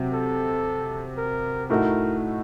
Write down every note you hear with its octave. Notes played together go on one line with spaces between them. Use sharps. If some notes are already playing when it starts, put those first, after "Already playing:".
Already playing: C3 F#3 C4
A4
A#4
A2 A3 D#4 F#4 A#4